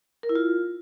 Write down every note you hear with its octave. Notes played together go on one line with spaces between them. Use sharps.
A#4
E4
F4